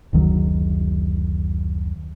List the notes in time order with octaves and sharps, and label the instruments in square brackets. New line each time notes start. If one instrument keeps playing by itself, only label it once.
[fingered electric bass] F#1 D2 D#3 F#3